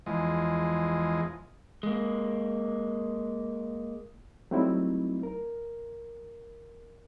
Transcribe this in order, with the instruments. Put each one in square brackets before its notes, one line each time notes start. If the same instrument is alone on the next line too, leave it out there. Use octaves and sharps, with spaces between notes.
[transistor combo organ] E2 F3 G#3 D#5
[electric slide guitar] G#3 A#3
[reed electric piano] F#3 G3 A3 C4 D#4 E4
A#4